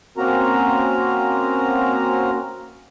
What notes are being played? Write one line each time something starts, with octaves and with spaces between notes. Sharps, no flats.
A#3 C4 C#4 F#4 A#4 A#5